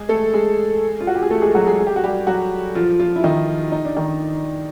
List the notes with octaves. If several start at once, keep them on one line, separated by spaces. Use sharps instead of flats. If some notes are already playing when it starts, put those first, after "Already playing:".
Already playing: G#3 G#4
A3 A4
G#3 G#4
F4
F#4
G4
G#4
A3 A4
G#3 G#4
F#3 F#4
G#3 G#4
G#4
G4
F#4
G3 G4
F#3 F#4
F3 F4
F3 F4
E4
D#3 D#4
D#4
D4
D#3 D#4